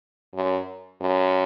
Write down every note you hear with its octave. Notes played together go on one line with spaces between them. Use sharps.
F#2
F#2